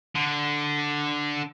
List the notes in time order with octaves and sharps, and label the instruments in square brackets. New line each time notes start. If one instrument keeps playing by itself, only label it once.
[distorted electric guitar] D3